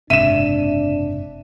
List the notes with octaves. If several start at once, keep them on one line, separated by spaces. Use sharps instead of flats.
F#1 G#2 C3 D4 E5 D#7 E7